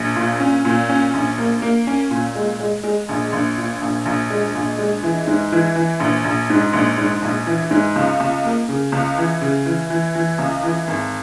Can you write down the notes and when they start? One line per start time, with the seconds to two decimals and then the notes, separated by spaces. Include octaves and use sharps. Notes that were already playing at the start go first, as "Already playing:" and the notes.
Already playing: A#1
0.16 A#2
0.40 C#4
0.65 A#2
0.89 C#4
1.14 A#1
1.38 A#3
1.62 A#3
1.87 C#4
2.11 A#2
2.36 G#3
2.60 G#3
2.84 G#3
3.09 A#1
3.33 A#1
3.57 A#2
3.82 A#1
4.05 A#1
4.30 G#3
4.55 A#1
4.79 G#3
5.03 E3
5.27 G#2
5.52 E3
5.76 E3
6.00 A#1
6.24 A#1
6.50 G#2
6.73 A#1
6.98 G#2
7.22 A#1
7.47 E3
7.71 G#2
7.96 C#2
8.20 C#2
8.44 A#3
8.69 C#3
8.92 C#2
9.18 E3
9.41 C#3
9.66 E3
9.90 E3
10.15 E3
10.38 C#2
10.63 E3
10.87 G#1